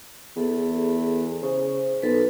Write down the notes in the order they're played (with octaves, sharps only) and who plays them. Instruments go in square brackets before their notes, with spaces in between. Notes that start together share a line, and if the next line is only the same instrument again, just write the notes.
[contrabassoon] E2 [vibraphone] G#4 A4
[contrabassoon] C#3 [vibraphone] C5
[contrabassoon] B1 [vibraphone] A4 B4